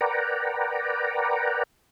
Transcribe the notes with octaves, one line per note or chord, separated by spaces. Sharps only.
A#4 B4 D5 F#5 G5 A#5